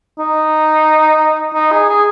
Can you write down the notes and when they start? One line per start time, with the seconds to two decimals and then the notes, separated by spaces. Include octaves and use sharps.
0.19 D#4
1.54 D#4
1.72 G#4
1.89 G#4